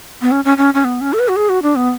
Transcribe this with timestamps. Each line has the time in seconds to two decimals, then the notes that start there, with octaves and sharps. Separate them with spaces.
0.22 B3
0.31 C#4
0.45 C#4
0.58 C#4
0.74 C#4
0.84 B3
1.01 C#4
1.13 A4
1.19 B4
1.28 F#4
1.36 G#4
1.49 F#4
1.62 D4
1.76 B3